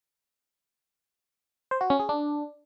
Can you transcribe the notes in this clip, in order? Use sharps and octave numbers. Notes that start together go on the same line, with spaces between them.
C5
F#4
C#4
G#4
D4